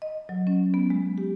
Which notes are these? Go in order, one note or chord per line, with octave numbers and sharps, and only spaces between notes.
D#5
F#3
C#4
B3
G#3
G4